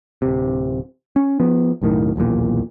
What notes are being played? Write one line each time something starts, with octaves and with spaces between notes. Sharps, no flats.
D1 C3
C#4
F3 B3
B1 F#2 A2 D#3
D#1 B1 E2 A#2